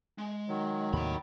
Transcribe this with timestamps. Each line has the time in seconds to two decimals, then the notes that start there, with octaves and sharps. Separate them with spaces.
0.18 G#3
0.48 D#3 F#3
0.93 D#2 A2 C3 G5 B5